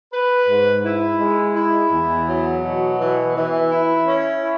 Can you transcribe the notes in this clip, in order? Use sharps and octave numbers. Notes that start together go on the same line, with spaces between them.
B4
G#2
E4
G#3
E4
E2
F#3
B2
E3
E3
E4
C#4
E4